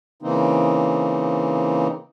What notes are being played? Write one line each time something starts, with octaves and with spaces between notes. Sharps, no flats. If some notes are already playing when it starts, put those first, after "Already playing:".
C#3 E3 A#3 C4 D#4